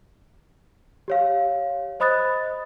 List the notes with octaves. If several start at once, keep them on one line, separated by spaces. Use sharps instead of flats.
G4 C#5 F5
C5 D#5 B5 D#6 F#6 A6